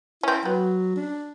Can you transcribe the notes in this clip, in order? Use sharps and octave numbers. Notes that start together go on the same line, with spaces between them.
C4 C#4 E4
F#3 B3
D4